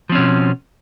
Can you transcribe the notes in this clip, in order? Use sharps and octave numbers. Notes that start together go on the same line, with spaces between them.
B2 F3 C4 C#4